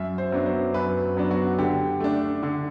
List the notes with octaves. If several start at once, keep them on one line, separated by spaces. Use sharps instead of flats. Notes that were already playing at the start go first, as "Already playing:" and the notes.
Already playing: F#2 E5
C5
F#3 B3 D4
C5
F#2 B4
F#3 B3 D4
F#4
D3 G4
A3 D4
D3